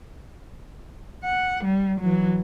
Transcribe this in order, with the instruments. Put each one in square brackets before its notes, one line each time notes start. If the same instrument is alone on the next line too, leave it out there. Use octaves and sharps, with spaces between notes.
[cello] F#5
G3
E3 F#3